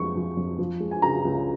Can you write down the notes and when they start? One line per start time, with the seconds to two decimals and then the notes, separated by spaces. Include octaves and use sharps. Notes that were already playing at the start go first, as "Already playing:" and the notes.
Already playing: F2 G#3 C#6
0.15 F3
0.37 F2
0.58 F3
0.80 G#3
0.91 G#5
1.02 C#3 A#5
1.25 C#2